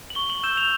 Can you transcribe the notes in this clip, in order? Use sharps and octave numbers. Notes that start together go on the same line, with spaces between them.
F#7
C#6 G7
F#7
E6 G6 E7
F7